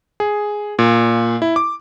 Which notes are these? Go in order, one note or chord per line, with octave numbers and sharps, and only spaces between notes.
G#4
A#2
E4
D6